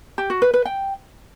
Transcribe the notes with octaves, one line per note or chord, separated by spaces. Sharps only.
G4
F#4
B4
B4
G5